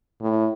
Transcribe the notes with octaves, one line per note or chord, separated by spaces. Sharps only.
A2